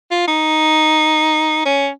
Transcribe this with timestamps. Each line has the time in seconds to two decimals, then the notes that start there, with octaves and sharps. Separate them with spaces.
0.11 F4
0.28 D#4
1.65 C#4